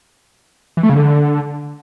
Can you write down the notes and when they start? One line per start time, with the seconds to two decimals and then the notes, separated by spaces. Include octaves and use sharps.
0.77 E3
0.83 A3
0.90 C#3
0.96 D3